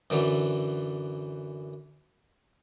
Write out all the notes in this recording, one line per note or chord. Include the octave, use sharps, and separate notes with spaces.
F#2 D3 E3 F#3